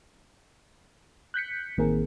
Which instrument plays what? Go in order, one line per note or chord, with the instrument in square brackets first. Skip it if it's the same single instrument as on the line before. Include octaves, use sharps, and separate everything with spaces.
[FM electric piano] F#6 G6 B6 C#7
A1 D#3 A#3 C4 G#4 A#4